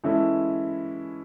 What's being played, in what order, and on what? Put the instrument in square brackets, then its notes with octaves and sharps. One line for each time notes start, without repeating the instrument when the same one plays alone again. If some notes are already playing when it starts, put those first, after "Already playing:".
[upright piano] E3 G#3 C#4 E4 A4